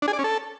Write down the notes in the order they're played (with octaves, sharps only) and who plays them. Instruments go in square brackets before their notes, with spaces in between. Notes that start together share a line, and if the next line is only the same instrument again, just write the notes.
[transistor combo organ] D4
G#4
D5
C#4
A4